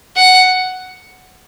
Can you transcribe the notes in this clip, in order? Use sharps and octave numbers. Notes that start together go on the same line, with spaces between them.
F#5